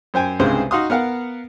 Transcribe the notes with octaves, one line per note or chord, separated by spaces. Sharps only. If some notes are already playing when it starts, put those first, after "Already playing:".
F#2 C5 G5 G#5
C2 G2 C#3 G#3 C4 C5
D#4 F#4 F5 C6 D#6
B3 A#4 F5 F#5